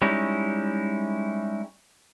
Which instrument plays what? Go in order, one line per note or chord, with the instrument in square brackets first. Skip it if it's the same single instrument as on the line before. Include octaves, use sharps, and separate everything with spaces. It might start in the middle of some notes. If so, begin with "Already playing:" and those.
[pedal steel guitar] G3 G#3 C#4 D#4 E4